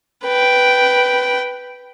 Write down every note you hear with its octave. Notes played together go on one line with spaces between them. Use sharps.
B4 G5